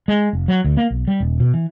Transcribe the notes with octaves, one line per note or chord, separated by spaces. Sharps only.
G#3
F1
F#3
D2
A#3
B1
G3
D#1
B2
E3